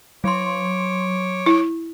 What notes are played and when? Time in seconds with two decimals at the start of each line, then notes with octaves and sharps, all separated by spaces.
0.24 F#3 C#5 C6 D6
1.46 E4